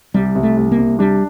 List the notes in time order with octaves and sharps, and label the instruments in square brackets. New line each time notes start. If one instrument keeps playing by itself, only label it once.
[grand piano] C2 [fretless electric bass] G3
[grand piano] C2
[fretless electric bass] A3
[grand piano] C2
[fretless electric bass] A#3
[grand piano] C2
[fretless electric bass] G3 [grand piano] D4